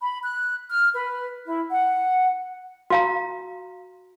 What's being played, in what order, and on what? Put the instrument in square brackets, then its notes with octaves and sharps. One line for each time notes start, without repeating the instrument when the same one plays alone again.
[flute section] B5
F#6
F6
B4
E4
F#5
[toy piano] F#4 F5 A#5